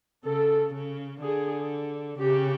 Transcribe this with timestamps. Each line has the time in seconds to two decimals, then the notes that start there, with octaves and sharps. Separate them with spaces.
0.24 C#3 A4
0.74 C#3
1.22 D3 G#4
2.19 C#3 G4